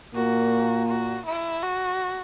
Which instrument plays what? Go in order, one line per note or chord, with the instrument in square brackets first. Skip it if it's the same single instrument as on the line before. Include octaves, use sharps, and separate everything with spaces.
[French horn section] A#2 A#3 [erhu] F#4
[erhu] F#4
E4
F#4